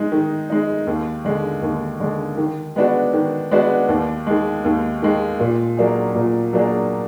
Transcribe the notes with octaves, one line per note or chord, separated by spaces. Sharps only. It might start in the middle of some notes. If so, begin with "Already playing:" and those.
Already playing: G#3 D#4
D#3
G#3 D#4
D#2
D3 G#3
D#2
D3 G#3
D#3
G#3 B3 D4 F#4
D#3
G#3 B3 D4 F#4
D#2
D#3 G#3
D#2
D#3 G#3
A#2
F#3 A#3 D4 G#4
A#2
F#3 A#3 D4 G#4